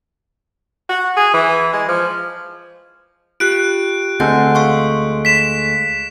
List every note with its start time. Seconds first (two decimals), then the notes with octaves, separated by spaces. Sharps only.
0.89 F#4
1.17 G#4
1.34 E3
1.73 G#3
1.89 F3
3.40 F4 G4 F#6 D7
4.20 D2 G#3 C4 A4 F#5 G6
4.55 F5 C6 C#6
5.25 B6 E7